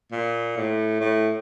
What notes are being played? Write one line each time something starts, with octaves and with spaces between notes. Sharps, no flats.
A#2
A2
A2